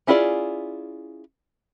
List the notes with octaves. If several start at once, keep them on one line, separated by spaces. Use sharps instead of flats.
C#4 E4 F4 G#4 D5